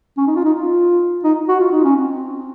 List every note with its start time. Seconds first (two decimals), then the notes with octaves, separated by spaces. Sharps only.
0.18 C#4
0.27 D#4
0.36 F4
0.44 D#4
0.54 F4
1.24 D#4
1.49 F#4
1.60 F4
1.72 D#4
1.84 C#4
1.96 C4